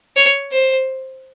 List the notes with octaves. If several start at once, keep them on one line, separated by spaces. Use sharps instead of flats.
C#5
C5